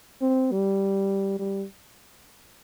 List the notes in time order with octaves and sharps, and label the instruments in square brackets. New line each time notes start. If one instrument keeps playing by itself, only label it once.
[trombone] C4
G3
G3